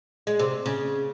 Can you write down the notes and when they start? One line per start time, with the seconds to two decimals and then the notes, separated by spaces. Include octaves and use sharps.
0.27 G#3
0.39 C3
0.66 C#3